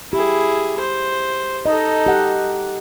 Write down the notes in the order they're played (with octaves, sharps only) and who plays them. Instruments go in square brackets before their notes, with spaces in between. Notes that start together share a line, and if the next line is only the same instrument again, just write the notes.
[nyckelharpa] E4 G#4 [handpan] G4
[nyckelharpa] C5
[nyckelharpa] D#4 A4 [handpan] D#5
[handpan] G4 F#5